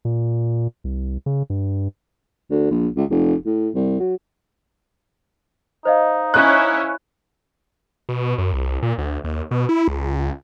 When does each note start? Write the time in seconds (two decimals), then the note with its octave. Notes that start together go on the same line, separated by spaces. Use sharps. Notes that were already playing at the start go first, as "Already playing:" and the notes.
0.05 A#2
0.84 C2
1.26 C#3
1.50 G2
2.50 D2
2.71 A#1
2.96 C#2
3.10 F1
3.46 A2
3.74 C2
4.00 F#3
5.85 D#4 C5 D#5 F5
6.34 C#4 E4 C#5 F#6
8.09 B2
8.38 F#2
8.53 C2
8.83 A#2
8.98 D2
9.24 D#2
9.51 B2
9.69 E4
9.88 C#2